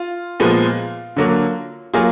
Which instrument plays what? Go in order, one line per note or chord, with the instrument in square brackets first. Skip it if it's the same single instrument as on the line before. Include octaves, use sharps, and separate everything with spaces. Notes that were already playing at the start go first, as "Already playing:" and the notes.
Already playing: [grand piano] F4
A#2 F3 G#3 B3
D3 F#3 A#3
F#3 A#3 F4 G#4